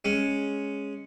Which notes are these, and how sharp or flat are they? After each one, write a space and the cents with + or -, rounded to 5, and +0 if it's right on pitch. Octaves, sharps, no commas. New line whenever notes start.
G#3 +0 C#4 +0